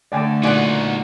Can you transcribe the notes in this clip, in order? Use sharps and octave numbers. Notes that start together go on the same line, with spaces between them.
D3 A3 D5 G5 G#5
A#2 B3 D#4 F#4 F#5 G#5 D6